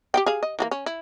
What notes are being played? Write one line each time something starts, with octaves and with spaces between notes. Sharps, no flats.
G4 F5 G5
G#4 F5
D#5
E3 F#3 A#3
C#4
E4